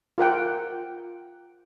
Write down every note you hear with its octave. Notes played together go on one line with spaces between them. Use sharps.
F4 A#4 F#5 G5